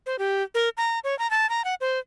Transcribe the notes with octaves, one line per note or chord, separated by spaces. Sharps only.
C5
G4
A#4
A#5
C#5
A#5
A5
A#5
F#5
C5